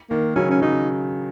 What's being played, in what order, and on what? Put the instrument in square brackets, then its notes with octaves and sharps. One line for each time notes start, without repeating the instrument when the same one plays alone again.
[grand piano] D#3 [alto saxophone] A#3
[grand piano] C#3 F#3 [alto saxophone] C#4
[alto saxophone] C#4
[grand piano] C#3 F#3 [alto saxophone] D#4